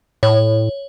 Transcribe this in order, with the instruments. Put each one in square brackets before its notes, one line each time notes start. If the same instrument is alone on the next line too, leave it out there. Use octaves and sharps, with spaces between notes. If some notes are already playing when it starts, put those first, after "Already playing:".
[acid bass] A2 [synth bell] C#5